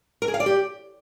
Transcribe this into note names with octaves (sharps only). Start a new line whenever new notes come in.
A#4
G#4
F5
D5
G4